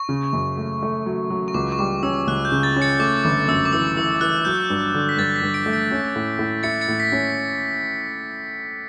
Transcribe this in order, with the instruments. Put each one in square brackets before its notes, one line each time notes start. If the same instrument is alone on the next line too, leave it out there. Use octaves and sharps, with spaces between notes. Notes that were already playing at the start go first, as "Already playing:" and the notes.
Already playing: [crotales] C#6
[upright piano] C#3
F#2
A3
A3
F#3
F#3
[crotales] C#6
[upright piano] C#2 [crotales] D6
[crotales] C#6
[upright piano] G3 [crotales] D6
[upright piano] C#4 [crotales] E6
[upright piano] C#2 [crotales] F#6
[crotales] G6
[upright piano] C#3
[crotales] A6
[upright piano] C#4
[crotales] A6 C#7
[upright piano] A3 [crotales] D6
[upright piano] G1 [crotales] D6
[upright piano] F#2 [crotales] E6
[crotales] D6
[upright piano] E3 [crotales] E6
[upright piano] E3 [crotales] E6
[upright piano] E3 [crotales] F#6
[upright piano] F#3 [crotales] G6
[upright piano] G2
D3
[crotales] B6
[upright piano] G2 [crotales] A6
[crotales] B6
[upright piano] G2
[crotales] B6 D7
[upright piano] A3
[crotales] B6 D7
[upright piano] C#4
A2
A2
[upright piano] E4 [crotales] A6 C#7
[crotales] A6 C#7
[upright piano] A2
[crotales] B6
[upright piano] C#4